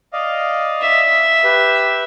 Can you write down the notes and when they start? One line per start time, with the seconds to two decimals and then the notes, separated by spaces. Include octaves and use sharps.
0.13 D5 D#5 F5
0.82 E5
1.44 G4 B4